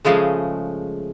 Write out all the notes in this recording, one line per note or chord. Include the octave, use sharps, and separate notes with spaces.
C#3 F3 G#3 A3